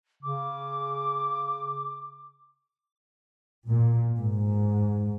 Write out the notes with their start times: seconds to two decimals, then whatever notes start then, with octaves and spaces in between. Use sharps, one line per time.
0.23 C#3 D6
3.69 A#2
4.19 G#2